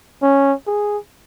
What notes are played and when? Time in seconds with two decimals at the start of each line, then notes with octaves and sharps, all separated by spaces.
0.22 C#4
0.67 G#4